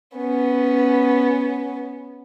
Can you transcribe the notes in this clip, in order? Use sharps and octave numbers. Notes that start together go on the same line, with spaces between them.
B3 C#4